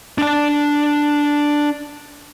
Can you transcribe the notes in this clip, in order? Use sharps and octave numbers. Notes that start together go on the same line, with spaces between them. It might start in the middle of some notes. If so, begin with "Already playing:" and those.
D4 A5